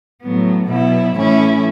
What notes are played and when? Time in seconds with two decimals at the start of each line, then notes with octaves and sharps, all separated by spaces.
0.23 A2 F#3 B3
0.68 B2 F#3 B3 E4
1.15 A2 E3 A3 C#4 E4